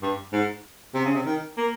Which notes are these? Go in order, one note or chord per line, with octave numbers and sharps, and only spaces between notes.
G2
G#2
C3
C#3
C3
D#3
A#3